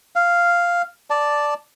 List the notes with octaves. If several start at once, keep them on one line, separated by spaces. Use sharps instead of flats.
F5
D5 A5